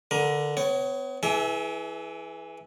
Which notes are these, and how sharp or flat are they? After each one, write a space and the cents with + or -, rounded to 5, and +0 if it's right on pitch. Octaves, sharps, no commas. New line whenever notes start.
D3 +0 A#4 +25
B3 +40 C#5 -5
E3 +0 G#4 +40 E5 -25